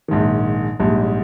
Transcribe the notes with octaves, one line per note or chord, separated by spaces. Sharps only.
A#1 G#2 D#3
A#1 G#2 G3